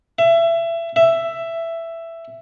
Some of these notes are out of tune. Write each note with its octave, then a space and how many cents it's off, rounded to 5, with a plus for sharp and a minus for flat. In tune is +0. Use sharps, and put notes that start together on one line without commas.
E5 +25
E5 +10